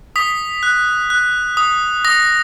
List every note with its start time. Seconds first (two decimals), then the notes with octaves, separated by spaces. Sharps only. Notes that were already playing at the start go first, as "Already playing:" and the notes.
0.16 D#6 B6
0.63 F#6
1.10 F#6
1.57 D#6
2.05 D#6 A#6